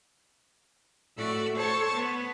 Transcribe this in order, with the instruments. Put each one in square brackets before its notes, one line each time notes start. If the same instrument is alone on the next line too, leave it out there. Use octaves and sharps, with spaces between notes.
[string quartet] A2 A3 F#4 A4 D5 E6
A4 C5 C#5 A5 C#6
B3